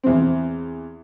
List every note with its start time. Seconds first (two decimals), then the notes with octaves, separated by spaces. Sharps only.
0.04 E2 C4